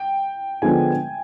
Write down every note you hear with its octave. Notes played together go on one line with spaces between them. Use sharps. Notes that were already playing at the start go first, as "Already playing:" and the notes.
Already playing: G5
D3 F3 G#3 B3 D4 G#5